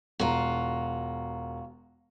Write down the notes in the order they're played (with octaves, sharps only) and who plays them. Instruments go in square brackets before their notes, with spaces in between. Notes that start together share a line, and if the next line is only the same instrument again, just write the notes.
[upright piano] E1 A#5 [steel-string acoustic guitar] F4 F#4